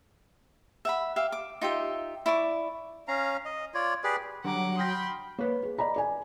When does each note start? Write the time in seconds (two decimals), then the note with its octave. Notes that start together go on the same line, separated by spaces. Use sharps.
0.85 E5 F#5 B5
1.16 G4 E5 F5
1.32 D6
1.61 D#4 F4 G4 E5
2.26 E4 D5 C#6 D6
3.08 C#4 F5 A#5
3.45 D#5
3.74 F4 C#5 D5
4.04 G4 G#4 B4 D5
4.44 D3 F#3 G3 F#5 A#5 D6
4.77 G5 B5 C6 D#6 F6 A#6
5.39 A#3 B4 C#5
5.63 G#4
5.79 D5 D#5 A#5 B5
5.96 D5 G#5